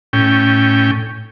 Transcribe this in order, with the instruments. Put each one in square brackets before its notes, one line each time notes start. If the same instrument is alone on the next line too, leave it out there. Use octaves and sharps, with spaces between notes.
[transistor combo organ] A2 C#4 G5